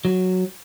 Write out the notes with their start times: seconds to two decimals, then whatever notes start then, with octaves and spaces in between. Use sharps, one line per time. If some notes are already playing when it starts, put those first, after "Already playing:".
0.05 F#3